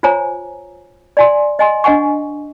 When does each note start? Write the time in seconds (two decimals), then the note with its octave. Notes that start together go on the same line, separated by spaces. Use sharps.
0.03 F4 C5 C#5 G#5 A#5
1.17 D5 G#5 C6
1.59 D#5 G#5 C6
1.84 D4 D#5 F#5 G#5 C#6